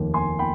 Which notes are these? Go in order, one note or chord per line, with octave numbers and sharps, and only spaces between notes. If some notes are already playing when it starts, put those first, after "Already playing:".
Already playing: F1 D#2 D#3
G#5 C6
G5 B5